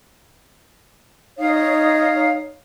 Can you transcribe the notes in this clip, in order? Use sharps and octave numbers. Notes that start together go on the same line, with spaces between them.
D#4 C#5 F5 D#6